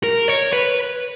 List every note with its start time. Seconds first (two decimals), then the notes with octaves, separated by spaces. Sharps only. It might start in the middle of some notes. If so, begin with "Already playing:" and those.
0.03 A#4
0.28 C#5
0.53 B4